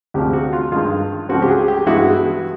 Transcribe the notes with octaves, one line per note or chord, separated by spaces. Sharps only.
D2 C3 F3 G#3 G4
F#4
F4
G2 D#3 G#3 F4
C#2 C#3 F3 A3 C4 F#4
G4
G#4
G4
G2 E3 G#3 B3 E4 F#4